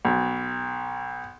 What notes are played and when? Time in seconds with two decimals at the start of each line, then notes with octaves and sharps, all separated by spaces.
0.05 B1